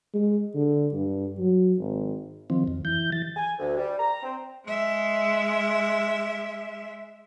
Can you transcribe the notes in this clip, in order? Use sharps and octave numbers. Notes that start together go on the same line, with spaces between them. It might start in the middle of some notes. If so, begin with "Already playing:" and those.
G#3
D3
G2
F#3
G#1
D#3 F3 C4
F2
E3 G6
E3 A6
G#5
D2
G3
A#5
C4
G#3 E5